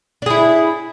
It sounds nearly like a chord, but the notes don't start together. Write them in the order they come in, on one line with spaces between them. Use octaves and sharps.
D4 G#4 E4